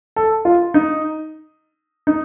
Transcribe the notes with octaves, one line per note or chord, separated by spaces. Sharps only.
A4
F4
D#4
D#4